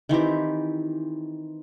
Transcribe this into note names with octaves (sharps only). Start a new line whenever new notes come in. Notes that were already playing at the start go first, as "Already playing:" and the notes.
D#3 E3 C4 G4